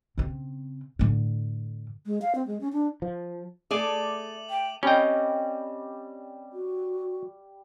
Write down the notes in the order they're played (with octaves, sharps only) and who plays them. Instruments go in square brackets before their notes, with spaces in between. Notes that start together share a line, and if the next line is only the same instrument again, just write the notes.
[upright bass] C#3 C4
A2 D3
[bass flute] G#3
F5
C4
G#3
C#4
D4
[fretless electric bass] F3
[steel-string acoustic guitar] A3 A4 [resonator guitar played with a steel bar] G#4 D5 [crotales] D6 D#7 F#7
[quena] G5
[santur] G3 [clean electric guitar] C4 D#5 [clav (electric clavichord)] C#4 G5
[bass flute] F#4